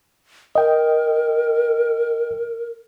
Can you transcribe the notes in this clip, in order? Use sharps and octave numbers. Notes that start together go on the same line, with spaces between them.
A#4 D#5 G5